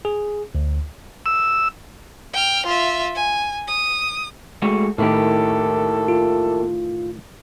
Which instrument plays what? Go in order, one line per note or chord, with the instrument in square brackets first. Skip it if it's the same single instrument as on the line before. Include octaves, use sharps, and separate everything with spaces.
[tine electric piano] G#4
D2
[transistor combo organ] E6
[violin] G5 F6
F4 E5
G#5
D#6
[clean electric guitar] G#3 A3 F#4
[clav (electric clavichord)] A2 D#3 [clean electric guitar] A#3 E4 G4 [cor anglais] A4
[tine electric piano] F4